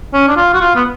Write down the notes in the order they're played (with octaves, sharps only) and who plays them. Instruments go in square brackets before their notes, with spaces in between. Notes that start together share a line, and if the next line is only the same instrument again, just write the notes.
[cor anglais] C#4
D4
F4
F#4
F4
B3